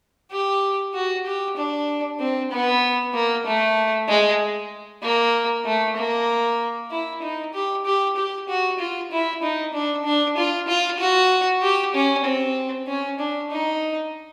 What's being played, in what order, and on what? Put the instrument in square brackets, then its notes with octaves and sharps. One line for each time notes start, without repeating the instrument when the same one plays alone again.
[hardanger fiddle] G4
F#4
G4
D4
C4
B3
A#3
A3
G#3
A#3
A3
A#3
E4
D#4
G4
G4
G4
F#4
F4
E4
D#4
D4
D4
F4
F4
F#4
G4
C#4
C4
C#4
D4
D#4